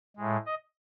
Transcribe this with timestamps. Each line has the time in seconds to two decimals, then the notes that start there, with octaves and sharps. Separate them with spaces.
0.17 A2 G#3
0.46 D#5